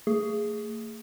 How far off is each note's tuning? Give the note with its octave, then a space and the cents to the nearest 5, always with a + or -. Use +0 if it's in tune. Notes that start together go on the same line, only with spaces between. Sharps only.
A3 +40 G#4 +0